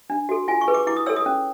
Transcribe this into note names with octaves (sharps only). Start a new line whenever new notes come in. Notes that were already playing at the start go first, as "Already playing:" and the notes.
D4
F#4 A4
F4 G#5
C#6
G#4 B4
D6
E4 D6
D#6
A4 C#5 E6
D#6
C#4